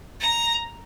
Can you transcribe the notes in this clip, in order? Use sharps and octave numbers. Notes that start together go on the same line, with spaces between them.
A#5